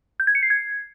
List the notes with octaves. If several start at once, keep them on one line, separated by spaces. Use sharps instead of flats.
G6
G#6
C#7
C7
G#6